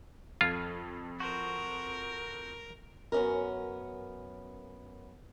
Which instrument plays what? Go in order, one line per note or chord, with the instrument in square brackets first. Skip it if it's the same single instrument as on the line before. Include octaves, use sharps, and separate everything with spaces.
[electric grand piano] F2 A4 G#6 [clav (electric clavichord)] F4
[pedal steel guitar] F#4 C5 [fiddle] A#4
[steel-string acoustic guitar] F#2 B3 C#4 D#4 A#4